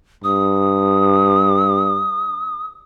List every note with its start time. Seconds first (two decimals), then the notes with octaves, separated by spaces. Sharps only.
0.24 G2 D#6